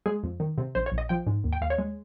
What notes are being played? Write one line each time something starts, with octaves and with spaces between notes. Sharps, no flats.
G#3 G#4
F2
D#3
C3
A#1 C5
C#5
A#1
D#5
F3 G5
G#2
D#2
G5
D#2 F5
C#5
G#3